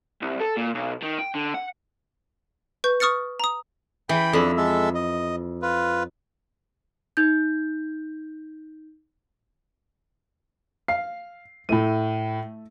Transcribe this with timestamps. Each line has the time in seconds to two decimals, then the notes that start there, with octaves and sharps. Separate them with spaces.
0.22 C2
0.40 A4
0.57 A#2
0.74 B1
1.02 D#3
1.18 G5
1.35 D3
1.54 F#5
2.84 B4 C#6 G6
3.00 C#6 D#6 F6 A6 C#7
3.40 A#5 D#6
4.09 E3 G5 B5
4.33 F2 D4 A4 B5
4.57 G#3 A4 E5
4.95 D#5
5.62 F4 B4
7.17 D#4 G6
10.88 F5 C7
11.69 A2 A3 E4 D#7